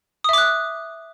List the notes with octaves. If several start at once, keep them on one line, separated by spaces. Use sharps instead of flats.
E5 D6 D#6 F#6